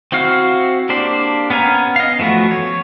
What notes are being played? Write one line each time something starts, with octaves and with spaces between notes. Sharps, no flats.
C4 E4 F#4 F5
A#3 D4 G4 C5
B3 C#4 F5 G#5 A#5
D#5 F5
E3 F3 A3 B3 F#4
C#5